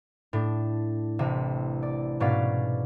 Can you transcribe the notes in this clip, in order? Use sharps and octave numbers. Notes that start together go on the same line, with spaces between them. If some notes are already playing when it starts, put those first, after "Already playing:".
A2 D4
A1 C3 E5
D5
G#2 B2 C#4 D5 F5 B6